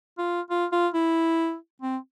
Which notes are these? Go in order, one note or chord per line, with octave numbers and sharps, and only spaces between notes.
F4
F4
F4
E4
C4